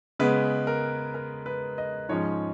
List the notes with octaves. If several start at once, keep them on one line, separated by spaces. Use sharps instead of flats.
C#3 G#3 B3 B4
A#4
A#4
B4
D#5
G#2 F3 G#3 C#4 C#5